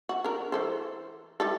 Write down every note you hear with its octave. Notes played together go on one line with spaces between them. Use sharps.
F#4
D4 A#4
E3 A4 C5
G3 E4 A4